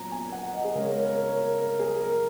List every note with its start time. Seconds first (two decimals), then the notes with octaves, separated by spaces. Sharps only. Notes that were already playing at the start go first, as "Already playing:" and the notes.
Already playing: A#2 F#3 A#5
0.12 G#5
0.32 F#5
0.43 F#5
0.53 D#5
0.64 G#4
0.75 C#3 G#3 A#4
0.82 C#5
0.90 A#4
0.98 C#5
1.05 A#4
1.13 C#5
1.21 A#4
1.28 C#5
1.36 A#4
1.58 A#4
1.79 G#4
2.00 A#4